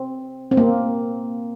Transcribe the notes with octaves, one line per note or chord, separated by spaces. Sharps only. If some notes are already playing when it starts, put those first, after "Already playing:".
Already playing: C4
C4
A#3